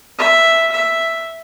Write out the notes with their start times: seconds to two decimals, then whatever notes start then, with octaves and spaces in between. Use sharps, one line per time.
0.19 E5
0.72 E5